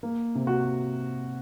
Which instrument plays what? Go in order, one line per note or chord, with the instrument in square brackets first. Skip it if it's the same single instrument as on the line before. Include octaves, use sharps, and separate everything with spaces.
[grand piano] A#3
C3
F#4